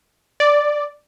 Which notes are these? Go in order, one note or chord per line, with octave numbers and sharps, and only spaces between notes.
D5